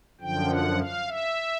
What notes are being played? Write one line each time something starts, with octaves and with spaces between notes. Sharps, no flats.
F#2 D3 F3 G5
F#5
F5
E5